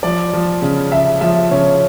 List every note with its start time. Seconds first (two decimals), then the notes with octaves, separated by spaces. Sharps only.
0.03 F3 D5
0.33 F3
0.62 C#3
0.92 C#3 E5
1.21 F3 E5
1.51 C#3 C#5